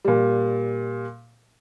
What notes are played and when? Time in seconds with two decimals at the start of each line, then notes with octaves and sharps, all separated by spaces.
0.05 A#2 G3